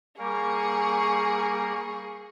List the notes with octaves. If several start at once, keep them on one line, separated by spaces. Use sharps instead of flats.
G3 A#3 G#4 A#4 C#6